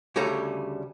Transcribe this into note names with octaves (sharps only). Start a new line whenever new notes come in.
D2 C#3 G3 C#4 A4 A#5